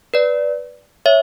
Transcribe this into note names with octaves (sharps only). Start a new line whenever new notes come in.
B4 D5
C#5 E5